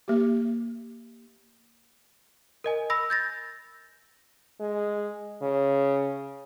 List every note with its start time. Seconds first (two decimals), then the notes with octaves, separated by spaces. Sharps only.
0.08 A#3 G4
2.64 A#4 D#5 G#5
2.90 B5 E6 A#6
3.10 G6 A6 A#6
4.60 G#3
5.42 C#3